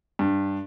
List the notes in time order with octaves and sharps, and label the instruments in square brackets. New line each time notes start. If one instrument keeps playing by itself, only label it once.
[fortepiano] G2